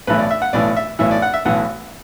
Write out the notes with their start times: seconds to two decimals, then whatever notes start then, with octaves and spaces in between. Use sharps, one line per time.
0.07 B1 A2 E3 B4
0.19 D5
0.31 E5
0.42 F#5
0.53 B1 A2 E3 D5
0.76 E5
0.99 B1 A2 E3 E5
1.11 D5
1.22 F#5
1.34 E5
1.45 B1 A2 E3 F#5